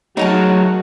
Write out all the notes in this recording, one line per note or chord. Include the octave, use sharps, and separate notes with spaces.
F#3 A3 D#4 F#4 G#4 A#4 C#5 A5